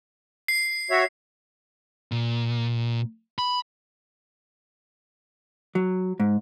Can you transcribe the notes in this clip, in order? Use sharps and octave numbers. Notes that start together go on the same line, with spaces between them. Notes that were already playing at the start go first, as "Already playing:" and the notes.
C7
F#4 C#5 E5
A#2
B5
F#3
G#2